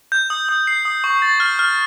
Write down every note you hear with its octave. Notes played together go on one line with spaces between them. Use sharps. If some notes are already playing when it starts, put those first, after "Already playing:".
G6
D#6
D#6
C7
D#6
C#6
A6
F6
F6